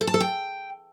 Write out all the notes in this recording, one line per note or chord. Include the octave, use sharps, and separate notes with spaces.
A4
A5
A4
G5